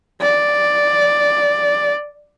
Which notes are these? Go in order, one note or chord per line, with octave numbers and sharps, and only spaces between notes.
D5